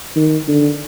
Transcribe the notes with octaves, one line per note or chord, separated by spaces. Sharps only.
D#3
D3